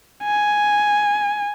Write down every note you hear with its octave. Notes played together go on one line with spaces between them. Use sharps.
G#5